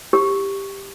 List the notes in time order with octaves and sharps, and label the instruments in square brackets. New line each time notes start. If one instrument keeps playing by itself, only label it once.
[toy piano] G4